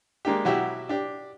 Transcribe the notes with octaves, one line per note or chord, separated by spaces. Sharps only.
G#3 A#3 D4 G4
B2 F#3 E4 F#4 G4 E5
D4 G4